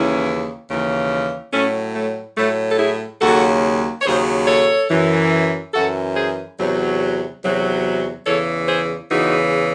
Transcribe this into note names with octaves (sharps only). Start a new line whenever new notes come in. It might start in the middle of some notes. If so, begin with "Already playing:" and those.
Already playing: D#2 C#3 E3 C#4 E4
D#2 C#3 E3
A2 F#3 A3 C#4
A3
A2 F#3 A3
A4
E4 G#4
D#2 C#3 F#3 F#4 A4
C#5
D#2 C#3 F#3 G#4 C5
A4 C#5
F#2 E3
F#2 E3 F#4 A4
G#4 C5
E2 C3 F#3
E2 C3 F#3
E2 C#3 E3 A4 C#5
G#4 C5
E2 C#3 E3 D#4 F#4